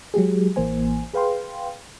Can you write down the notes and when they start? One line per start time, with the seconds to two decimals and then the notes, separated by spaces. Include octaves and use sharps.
0.14 F#3 G#3 G4 G#4
0.56 A1 E3 A#3 C5 G#5
1.14 G#4 B4 F5 G5 C6